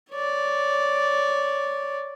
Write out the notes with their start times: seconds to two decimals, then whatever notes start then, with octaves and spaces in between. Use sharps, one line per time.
0.11 C#5 D5